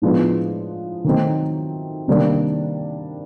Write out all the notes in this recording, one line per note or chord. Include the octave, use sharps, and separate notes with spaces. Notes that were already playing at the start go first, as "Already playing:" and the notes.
A2 F3 G#3 B3 D4
D#3 F#3 A3 C4 D#4
C3 D#3 G3 A#3 D4